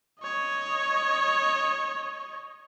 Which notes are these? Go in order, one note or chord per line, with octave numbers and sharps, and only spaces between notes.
C#5 D#5